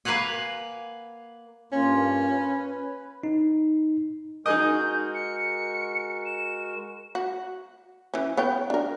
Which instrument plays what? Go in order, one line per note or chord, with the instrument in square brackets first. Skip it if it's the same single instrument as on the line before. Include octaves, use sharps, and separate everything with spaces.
[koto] A#3 B4 F5 F#5 G#5
[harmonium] G2 A#3 F4 [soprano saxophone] C#4
[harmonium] B4
[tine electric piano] D#4
[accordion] G#3 F#4 A#4 [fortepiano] D#4 G#4 D#5 [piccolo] G6
[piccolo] C#7
E7
[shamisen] F#4
E3 C#4
B3 C#5 G5
D4 A#4